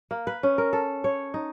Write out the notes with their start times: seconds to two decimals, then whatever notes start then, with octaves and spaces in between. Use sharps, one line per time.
0.11 A#3
0.27 B4
0.43 C#4
0.58 A#4
0.73 A4
1.04 C#5
1.34 D#4